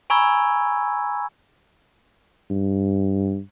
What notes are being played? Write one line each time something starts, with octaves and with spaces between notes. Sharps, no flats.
G#5 A#5 B5 C#6 E6 G#6
G2